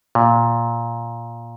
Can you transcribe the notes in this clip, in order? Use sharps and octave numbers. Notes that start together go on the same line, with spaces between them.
A#2